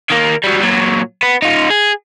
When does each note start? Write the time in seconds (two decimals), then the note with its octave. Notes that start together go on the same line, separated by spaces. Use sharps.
0.11 D#3 A#3
0.44 F#3 G3
0.62 A#2 F#3
1.23 B3
1.42 D#4 F4
1.70 G#4